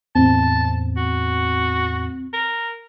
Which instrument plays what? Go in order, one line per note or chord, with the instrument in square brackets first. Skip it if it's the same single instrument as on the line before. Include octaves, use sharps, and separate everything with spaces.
[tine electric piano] E2 A2 [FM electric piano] C4 [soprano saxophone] A5
[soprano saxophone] F#4
A#4